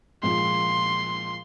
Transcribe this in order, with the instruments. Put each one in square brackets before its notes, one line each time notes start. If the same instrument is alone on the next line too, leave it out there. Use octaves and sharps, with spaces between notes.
[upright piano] A#2 F3 G#3 [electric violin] C6